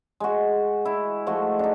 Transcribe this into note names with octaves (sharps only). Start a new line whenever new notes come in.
G#3 F#4
E4
F3 G#3 A3 F#4
D4 D#4